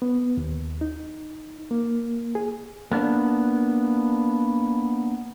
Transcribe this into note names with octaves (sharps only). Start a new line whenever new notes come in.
B3
D#2
D#4
A#3
G#4
A#3 B3 D4